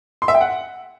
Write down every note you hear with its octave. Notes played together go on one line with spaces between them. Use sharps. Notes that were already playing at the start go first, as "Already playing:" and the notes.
C6
E5
G5
F#5